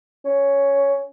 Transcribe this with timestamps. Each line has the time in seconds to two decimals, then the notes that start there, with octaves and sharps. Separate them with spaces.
0.25 C#4